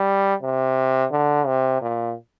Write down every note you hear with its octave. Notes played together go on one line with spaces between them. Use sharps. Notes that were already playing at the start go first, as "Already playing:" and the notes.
Already playing: G3
C3
D3
C3
A#2